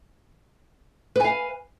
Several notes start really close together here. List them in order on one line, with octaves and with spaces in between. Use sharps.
B4 G#5 F5